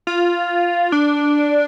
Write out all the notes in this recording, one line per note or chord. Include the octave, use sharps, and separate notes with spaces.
F4
D4